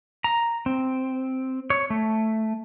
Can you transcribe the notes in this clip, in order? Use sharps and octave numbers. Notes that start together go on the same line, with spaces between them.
A#5
C4
C#5
A3